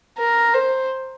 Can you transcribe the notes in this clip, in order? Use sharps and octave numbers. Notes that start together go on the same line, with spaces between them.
A#4
C5